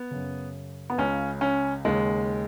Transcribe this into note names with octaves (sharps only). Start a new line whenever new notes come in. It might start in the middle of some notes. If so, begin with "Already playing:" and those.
Already playing: B3
F#2 C#3
B3
C#2 C#3 C#4
C#4
D#2 C#3 G#3